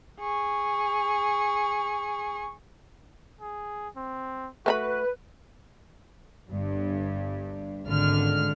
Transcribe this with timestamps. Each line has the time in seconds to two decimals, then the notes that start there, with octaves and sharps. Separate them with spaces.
0.20 G#4 C#6
3.41 G#4
3.96 C4
4.66 A3 F#4 A4 B4 B5
6.50 G1 G2
7.85 G#1 C#2 D3 F6